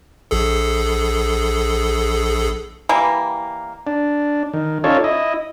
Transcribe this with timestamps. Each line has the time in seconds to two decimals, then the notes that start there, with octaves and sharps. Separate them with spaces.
0.31 A#1 G#4 A4
2.89 E3 G3 A#3
3.87 D4
4.53 D#3
4.84 C#4 D#4 F4 A4 C#5 D5
5.04 E4 D#5